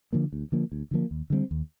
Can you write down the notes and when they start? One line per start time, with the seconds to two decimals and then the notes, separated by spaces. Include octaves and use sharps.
0.13 D3 F3 A#3
0.33 D2
0.52 D3 F3 A#3
0.72 D2
0.91 D3 F3 A#3
1.11 D#2
1.30 D3 G3 C4
1.51 D#2